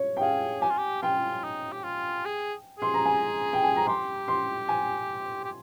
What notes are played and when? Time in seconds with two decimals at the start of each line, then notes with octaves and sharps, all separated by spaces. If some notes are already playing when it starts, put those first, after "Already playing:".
Already playing: C#5
0.17 G5
0.21 G#4 F5
0.62 G4 G#5
0.70 F4
0.78 G4
1.02 F4 G5
1.44 D#4
1.72 G4
1.84 F4
2.25 G#4
2.79 G#4 C6
2.94 A#5
3.05 G#5
3.53 G5
3.64 G#5
3.76 A#5
3.87 G4 C6
4.28 C6
4.69 G#5
5.44 G4